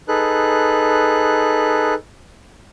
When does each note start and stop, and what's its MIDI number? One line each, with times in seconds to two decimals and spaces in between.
0.08 1.94 63
0.08 1.94 68
0.08 1.94 69
0.08 1.94 71
0.08 1.94 90